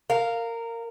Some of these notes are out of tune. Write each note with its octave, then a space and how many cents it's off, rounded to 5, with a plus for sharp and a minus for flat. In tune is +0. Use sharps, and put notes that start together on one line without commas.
A#4 -15 F5 +0